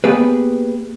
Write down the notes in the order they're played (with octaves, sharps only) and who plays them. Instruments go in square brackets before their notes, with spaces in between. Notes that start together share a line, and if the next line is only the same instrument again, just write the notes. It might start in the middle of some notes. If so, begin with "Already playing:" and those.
[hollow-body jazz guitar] A#3 B3 G4 G#4 B4